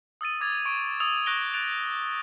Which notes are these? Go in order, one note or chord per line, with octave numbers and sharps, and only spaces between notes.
D#6 E6 A6 D#7
D6 G#6 A6 F7
C#6 D7
D#6 E6 F7
C#6 F#6 A#6 D7 G7
F#6 A6 D7 F7